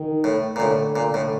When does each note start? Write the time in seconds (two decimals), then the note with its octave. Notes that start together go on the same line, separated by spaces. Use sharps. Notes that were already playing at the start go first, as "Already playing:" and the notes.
Already playing: D#3
0.24 A2
0.56 A#2
0.60 A2 D3
0.96 A#2
1.14 A2